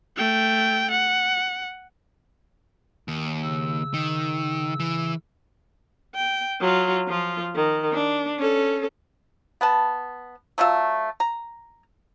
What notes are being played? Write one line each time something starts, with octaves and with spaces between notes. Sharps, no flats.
A3 G5
F#5
D#2
C#3 E6
D#3
E3
G5
F#3 F4
F3 F4
D#3
D4
C#4 A4
B3 B4 A5
F#3 A3 F4 E5
A#5